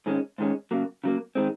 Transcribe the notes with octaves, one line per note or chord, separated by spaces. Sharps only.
G#2 D#3 G#3 C#4
G#2 D#3 G#3 C#4
C#3 F#3 A#3
C#3 F#3 A#3
D#3 G#3 C4